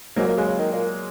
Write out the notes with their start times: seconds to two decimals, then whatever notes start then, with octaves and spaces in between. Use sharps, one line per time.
0.16 G#2 F#3 A#3
0.28 A#2
0.37 C#3 G#3
0.48 C#3
0.59 D#3
0.72 A#2